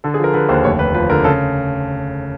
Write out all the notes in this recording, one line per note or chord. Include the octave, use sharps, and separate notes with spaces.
D3 A4
G#4
F3 A#4
D3 B4
D#2 C5
F1 C#5
D#2 B4
F3 B4
D3 A#4
C#3 A4